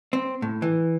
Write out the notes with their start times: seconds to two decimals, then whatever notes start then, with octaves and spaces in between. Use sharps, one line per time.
0.13 C4
0.42 A2
0.62 E3